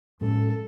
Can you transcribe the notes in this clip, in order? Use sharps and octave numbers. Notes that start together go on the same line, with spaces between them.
A2 G#3 C#4 A4